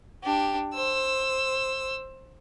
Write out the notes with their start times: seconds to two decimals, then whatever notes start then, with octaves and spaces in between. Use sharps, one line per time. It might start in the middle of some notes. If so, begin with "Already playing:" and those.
0.23 D4 G4
0.74 C5 E6